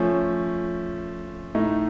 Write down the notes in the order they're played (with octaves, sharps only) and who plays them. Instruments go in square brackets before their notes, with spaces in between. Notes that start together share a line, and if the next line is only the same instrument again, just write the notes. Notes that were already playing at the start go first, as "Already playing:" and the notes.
Already playing: [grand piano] F3 A3 C#4
A2 A3 D#4